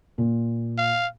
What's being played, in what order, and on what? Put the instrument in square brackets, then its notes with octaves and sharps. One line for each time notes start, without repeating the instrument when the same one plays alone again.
[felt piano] A#2
[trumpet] F5